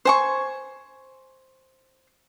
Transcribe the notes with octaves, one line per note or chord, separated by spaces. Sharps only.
C5 G#5 C#6